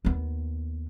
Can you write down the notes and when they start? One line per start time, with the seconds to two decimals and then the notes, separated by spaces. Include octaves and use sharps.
0.05 D#2 B3